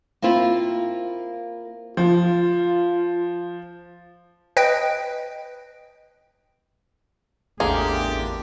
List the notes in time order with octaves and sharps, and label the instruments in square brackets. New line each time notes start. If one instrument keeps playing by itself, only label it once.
[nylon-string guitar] A#3 C4 E4 F4
[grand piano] F3 [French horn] F4
[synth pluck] B4 D#5 G5
[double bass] A1 [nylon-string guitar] E2 D3 [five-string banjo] A#3 G#4 [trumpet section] D4 F4 G4